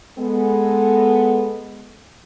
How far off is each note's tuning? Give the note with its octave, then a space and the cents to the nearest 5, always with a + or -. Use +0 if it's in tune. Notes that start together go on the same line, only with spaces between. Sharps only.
G#3 +0 B3 +0 A4 +0